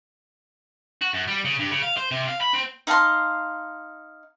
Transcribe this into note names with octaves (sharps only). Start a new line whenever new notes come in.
F#4
F#2
G3
C#3
G2
C#3
F5
C5
C3
F5
B5
C4
D#4 F5 A5 C6